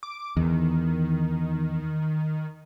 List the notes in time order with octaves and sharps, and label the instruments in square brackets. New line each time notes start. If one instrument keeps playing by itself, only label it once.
[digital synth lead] D6
[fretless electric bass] E2 [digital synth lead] D#3